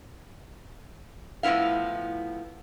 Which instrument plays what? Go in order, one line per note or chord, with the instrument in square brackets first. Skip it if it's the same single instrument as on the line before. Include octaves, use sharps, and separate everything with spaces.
[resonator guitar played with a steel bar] A2 F3 B3 E4 F5